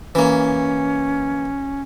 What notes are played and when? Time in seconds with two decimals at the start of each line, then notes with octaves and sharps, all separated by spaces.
0.15 E3 A#3 C#4